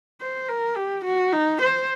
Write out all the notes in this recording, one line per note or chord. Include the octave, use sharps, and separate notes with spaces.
C5
A#4
G4
F#4
D#4
C5